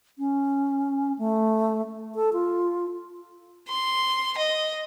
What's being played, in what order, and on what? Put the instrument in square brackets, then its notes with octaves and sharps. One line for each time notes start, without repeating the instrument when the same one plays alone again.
[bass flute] C#4
A3
A4
F4
[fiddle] C6
D#5